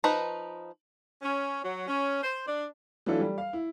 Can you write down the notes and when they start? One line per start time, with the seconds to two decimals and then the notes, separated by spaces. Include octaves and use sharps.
0.04 F3 D#4 B4 A#5
1.22 C#4
1.64 F#3
1.87 C#4
2.23 C5
2.47 D4
3.06 E3 F#3 A3 D4 F4 A4
3.20 G3
3.38 F5
3.53 E4